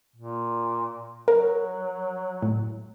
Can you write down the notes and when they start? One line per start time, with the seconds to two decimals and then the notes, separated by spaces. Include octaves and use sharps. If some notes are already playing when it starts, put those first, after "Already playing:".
0.16 A#2
1.28 F#3 A#4
2.42 A2